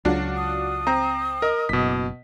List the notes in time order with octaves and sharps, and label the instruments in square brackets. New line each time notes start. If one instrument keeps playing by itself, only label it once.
[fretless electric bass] C#2 F#3 [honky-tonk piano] D4 F4 F#4
[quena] D#6
[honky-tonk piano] C4 [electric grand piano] G5 A#5
[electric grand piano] A#4 [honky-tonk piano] D#5
[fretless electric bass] F#1 [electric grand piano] B2 B6